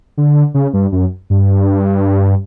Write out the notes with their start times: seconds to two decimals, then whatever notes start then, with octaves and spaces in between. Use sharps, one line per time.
0.17 D3
0.54 C#3
0.74 G2
0.92 F#2
1.30 G2